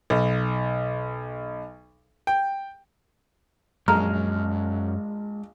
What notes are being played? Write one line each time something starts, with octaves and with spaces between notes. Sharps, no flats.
B1
G5
A#1 F#2 G#3 A#5 F6